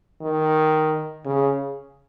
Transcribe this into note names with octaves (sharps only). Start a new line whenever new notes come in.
D#3
C#3